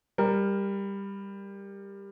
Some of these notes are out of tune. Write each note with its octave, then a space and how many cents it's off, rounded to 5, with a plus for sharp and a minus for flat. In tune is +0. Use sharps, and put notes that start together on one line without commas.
G3 +15 A#4 +0